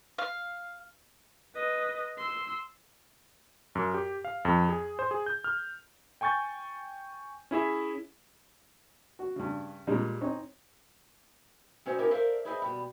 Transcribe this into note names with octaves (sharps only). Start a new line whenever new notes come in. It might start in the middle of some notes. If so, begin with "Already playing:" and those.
F5
B4 D#5
C6 E6
F#2
G4
F5
F2
G#4
C5
G#4
G6
F6
G5 G#5 C#6 G6 A6
C#4 E4 G#4 E5
F#4
G2 C#3
A#2 G3 G#3
C4 C#4 D#4
F#3 C#4 C5 C#5 D#5
B3 C#4 D#4 E4 G4 A#4
A4 A#4 C5 D5 E5 F5
E4 G#4 B4 C5 D#5 E5
B2 G3